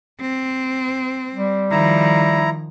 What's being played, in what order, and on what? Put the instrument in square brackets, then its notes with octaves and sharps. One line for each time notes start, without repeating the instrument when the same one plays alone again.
[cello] C4
[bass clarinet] G3
[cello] D#3 F3 [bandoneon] E4 A#5